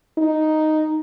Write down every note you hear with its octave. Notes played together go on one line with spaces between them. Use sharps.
D#4